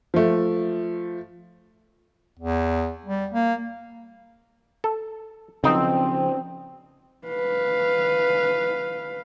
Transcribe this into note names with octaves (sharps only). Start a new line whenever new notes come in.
F3 A3
E2
G3
A#3
A4
B1 C#3 F3 C4 D#4
B4 F5